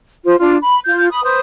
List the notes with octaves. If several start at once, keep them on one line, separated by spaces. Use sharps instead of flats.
F4 C5
D4 F4
B5
F4 G6
B5 D#6
B4 C5 D#6